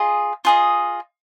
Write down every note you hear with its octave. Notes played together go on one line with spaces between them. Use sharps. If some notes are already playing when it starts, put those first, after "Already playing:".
Already playing: F4 G#4 D#5
F4 G#4 D#5